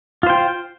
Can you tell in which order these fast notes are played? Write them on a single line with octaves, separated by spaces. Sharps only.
F4 C5 G5